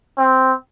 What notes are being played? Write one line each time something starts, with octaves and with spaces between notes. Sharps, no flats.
C4